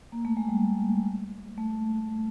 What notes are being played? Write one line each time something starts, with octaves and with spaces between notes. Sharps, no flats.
A#3
A3
G#3
G3
A3